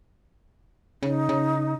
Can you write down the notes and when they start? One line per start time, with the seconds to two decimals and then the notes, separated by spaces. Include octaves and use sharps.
1.03 C#3 D#4
1.29 C#3